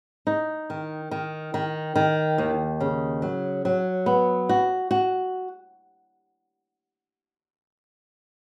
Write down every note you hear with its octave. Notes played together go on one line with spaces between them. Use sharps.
D#4
D#3
D#3
D#3
D#3
D#2
C#3
F#3
F#3
B3
F#4
F#4